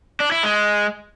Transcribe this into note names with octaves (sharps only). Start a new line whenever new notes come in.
D4
E4
G#3